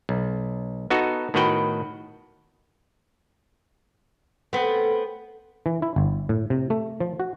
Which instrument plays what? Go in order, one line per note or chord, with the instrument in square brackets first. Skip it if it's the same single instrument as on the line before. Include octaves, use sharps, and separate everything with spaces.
[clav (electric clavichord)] B1
B3 D#4 F#4 A4
A2 D#3 B3 F#4 B4 G5
[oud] A3 [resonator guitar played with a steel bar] B3 C4
[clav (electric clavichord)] E3
E4
G1
A2
C3
A3
F3
F#4